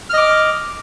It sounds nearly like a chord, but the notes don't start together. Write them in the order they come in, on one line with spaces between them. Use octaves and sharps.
F6 D#5 D6